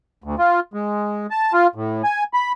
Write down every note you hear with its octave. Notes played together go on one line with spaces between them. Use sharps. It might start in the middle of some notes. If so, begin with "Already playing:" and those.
D2
F4
G#3
A5
F4
A2
G#5
B5